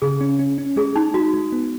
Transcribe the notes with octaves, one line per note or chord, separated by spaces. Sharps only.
C#3 G#4
C#4
C#4
C#4
G#3 G#4
G#3 D#4
G#3 F#4
G#3
B3